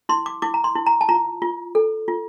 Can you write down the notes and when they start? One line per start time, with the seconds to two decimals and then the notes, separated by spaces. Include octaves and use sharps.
0.09 E4 C6
0.26 D6
0.42 E4 D6
0.54 A#5
0.64 C6
0.76 E4
0.86 A#5
1.01 A5
1.09 F4 A#5
1.42 F4
1.75 A4
2.08 F4